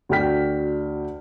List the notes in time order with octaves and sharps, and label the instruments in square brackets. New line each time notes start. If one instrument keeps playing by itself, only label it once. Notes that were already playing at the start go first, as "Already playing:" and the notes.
[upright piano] D2 F#4 D5 G5 F6 B6